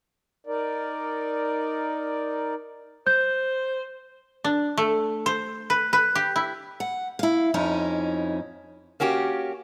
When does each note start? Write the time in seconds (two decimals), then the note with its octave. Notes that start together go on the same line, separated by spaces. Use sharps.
0.47 D#4 A#4 D5
3.07 C5 G6
4.44 D4
4.78 A3
5.26 C5
5.70 B4
5.93 B4
6.15 G4
6.36 E4
6.80 F#5
7.19 E4 F5
7.54 F2 C#4 D#4 E4
9.00 A#3 C#4 F#4 G4